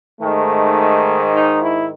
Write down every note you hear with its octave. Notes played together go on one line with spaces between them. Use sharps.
G#2 D#3 A3
D#4
E4